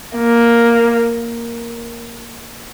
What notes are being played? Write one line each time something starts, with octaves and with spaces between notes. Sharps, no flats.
A#3